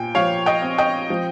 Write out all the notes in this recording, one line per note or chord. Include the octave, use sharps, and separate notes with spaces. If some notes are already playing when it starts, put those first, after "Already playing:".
Already playing: A#2 G5 G#5
F3 C#5 F5
D#5 G5
C4
D#5 G5
F3